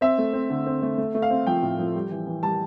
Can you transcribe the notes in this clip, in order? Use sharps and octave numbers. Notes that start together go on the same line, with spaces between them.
C4 E5
A3
C4
D3
C4
A3
A3
A3
F5
C4
F3 G5
A2
F3
G3
E3
E3
G3 A5